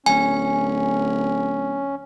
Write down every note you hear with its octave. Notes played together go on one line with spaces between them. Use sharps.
D1 C#4 G#5